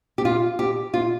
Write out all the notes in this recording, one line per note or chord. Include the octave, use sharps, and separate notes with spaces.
G4
F4
G4
F4